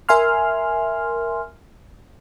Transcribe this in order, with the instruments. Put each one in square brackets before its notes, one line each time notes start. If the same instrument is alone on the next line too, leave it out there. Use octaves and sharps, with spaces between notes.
[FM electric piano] A#4 E5 G#5 C6 F6